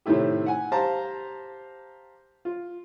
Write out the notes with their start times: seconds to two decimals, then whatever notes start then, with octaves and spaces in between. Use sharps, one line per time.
0.06 A2 C3 D#3 A3 E4 G4
0.46 F#5 G#5
0.72 G4 C5 F5 A5 A#5
2.45 F4